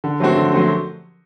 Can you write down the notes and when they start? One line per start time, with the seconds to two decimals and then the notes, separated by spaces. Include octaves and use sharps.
0.04 D3
0.20 F#3 A3 C4 F#4
0.36 D3
0.52 F#3 A3 C4 F#4